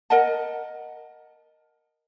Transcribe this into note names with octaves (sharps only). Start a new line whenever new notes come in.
A#4 D#5 F#5 A5